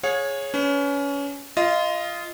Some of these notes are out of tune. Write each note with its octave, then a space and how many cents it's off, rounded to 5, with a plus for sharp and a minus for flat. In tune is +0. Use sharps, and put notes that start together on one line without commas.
G#4 +0 C#5 -10 F5 +45
C#4 +25 B4 +30
F4 -20 D#5 +10